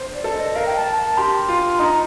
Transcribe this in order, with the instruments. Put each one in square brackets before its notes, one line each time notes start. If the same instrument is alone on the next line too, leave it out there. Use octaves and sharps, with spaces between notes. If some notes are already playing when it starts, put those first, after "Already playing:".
Already playing: [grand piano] C5
[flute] D5
[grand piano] A4
[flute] D#5
[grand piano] A#4 [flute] F5
[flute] G5
A5
A5
[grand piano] G4 [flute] C6
[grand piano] F4
[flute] C6
[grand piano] D#4 [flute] A#5